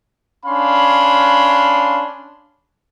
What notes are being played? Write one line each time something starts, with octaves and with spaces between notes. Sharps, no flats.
C#4 D4 F5 B5 C6